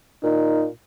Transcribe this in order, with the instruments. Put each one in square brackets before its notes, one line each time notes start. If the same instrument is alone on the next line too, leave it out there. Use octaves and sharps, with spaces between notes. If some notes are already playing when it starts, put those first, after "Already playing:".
[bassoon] A#2 [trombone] D#4